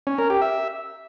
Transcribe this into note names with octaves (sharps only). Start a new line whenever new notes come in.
C#4
A#4
G4
E5